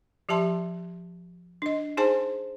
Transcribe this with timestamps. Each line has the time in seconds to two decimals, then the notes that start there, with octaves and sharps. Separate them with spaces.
0.29 F3 G4 E5 A5 C6
1.62 D4 D#5
1.97 D#4 G#4 C5 G#5 A5 C6